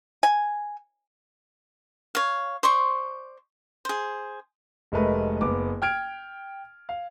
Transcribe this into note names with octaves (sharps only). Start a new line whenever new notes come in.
G#5
C#5 F5
C5 D5 C6 C#6
G#4 C5
F1 G#3 A3 A#4 B4 D#5
F#1 B3 D6
G5 F6 G#6 D7
F5